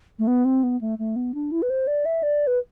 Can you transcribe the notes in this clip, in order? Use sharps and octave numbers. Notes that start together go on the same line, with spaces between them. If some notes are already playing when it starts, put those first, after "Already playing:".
A3
B3
C4
B3
A3
A3
B3
D4
E4
B4
C5
D5
E5
D5
B4